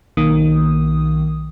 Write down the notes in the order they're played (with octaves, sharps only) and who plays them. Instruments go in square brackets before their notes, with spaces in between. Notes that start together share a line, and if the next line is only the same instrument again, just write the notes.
[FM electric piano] B1 D#3 A#3 D#6